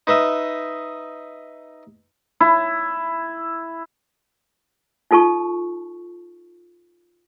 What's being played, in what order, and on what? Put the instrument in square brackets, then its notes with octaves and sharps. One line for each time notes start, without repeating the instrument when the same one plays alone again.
[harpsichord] D#4 B4 D#5 E5
[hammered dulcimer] E4
[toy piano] D#4 F4 A4 A5 C#6